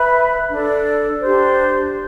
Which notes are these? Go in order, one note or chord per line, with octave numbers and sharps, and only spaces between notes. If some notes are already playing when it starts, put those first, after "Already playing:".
Already playing: B4 E5 B5
D4 A4 D5
D4 G4 C5